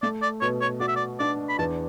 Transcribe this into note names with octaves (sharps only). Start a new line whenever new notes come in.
A3 D5
D5
B2 C#5
C#5
F#4 D5
E5
D5
D4 D5
B5
E2 A5